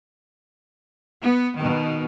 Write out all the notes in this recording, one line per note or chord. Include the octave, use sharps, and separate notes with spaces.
B3
B2 D#3